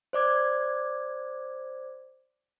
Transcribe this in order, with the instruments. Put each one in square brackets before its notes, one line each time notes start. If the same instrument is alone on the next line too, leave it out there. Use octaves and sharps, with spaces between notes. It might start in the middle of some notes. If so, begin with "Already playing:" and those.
[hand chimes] C5 D5 D6 G#6